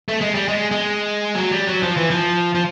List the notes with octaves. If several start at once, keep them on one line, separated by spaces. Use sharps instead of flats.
A3
G#3
G3
G#3
G#3
F#3
G3
F#3
F3
E3
F3
F3